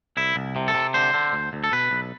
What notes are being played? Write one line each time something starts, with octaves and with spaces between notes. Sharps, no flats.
C2 E4
C2
C3
A4
C3
D3 C5
D3
D2
D2
A4
B2 B4
B1